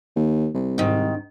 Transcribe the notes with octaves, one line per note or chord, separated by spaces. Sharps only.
D#2
C2
G#2 D#3